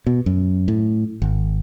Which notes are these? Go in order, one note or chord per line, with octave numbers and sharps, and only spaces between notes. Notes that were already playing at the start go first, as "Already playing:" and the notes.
B2
F#2
A2
G#1